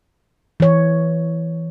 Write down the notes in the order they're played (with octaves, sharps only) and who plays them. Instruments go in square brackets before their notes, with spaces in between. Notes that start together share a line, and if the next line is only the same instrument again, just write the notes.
[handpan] E3 C#5